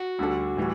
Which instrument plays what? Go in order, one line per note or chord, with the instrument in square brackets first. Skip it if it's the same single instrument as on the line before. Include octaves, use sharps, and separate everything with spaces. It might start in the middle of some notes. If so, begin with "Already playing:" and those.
Already playing: [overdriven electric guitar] F#4
[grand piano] D2 D3 G3 D4 A4
A2 E3 G3